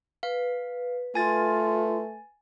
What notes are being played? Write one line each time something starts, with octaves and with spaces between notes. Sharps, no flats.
B4 F5
A3 F4 G#5 A6